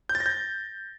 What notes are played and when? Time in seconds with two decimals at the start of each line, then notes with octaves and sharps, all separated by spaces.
0.09 G6
0.15 A6
0.20 A#6
0.26 G6